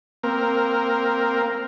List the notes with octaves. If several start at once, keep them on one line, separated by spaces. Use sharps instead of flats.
A#3 C4 A#4